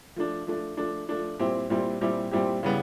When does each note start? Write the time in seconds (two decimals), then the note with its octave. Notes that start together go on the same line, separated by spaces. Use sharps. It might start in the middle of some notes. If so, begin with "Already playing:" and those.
0.16 F3 A3 D4
0.47 F3 A3 D4
0.77 F3 A3 D4
1.09 F3 A3 D4
1.39 A#2 G3 C4 E4 G4
1.70 A#2 G3 C4 E4 G4
2.01 A#2 G3 C4 E4 G4
2.31 A#2 G3 C4 E4 G4
2.63 C#3 E3 G3 B3